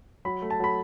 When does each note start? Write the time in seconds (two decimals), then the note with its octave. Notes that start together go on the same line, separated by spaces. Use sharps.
0.25 F#3 B5
0.42 A3
0.50 A5
0.60 F#3 B5